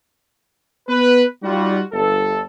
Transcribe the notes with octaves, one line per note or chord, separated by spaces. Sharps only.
B3 B4
G3 D#4 F4 F#4
G1 A4